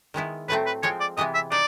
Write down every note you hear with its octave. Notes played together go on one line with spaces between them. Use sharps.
D#3 G#3 B3 E4
A2 F#3 A3 C4 B4
B4
F3 G#3 C4 C#5
D5
C3 E3 G#3 B3 D#5
E5
D#4 D5